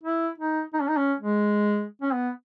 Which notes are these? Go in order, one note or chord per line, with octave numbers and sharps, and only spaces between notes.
E4
D#4
D#4
C#4
D#4
C#4
G#3
C#4
B3